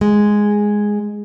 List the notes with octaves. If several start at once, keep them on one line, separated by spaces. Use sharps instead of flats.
G#3